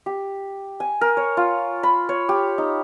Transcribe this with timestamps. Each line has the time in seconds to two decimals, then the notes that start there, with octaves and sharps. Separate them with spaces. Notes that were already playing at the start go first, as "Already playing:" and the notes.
0.06 G4
0.80 G#5
1.01 A#4
1.17 C#5
1.37 F4
1.83 B5
2.09 C#5
2.29 G4
2.58 D#4